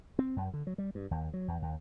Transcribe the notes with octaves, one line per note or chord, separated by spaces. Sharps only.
C4
F#2
D3
F#3
G3
G2
D#2
F#3
E2
D#2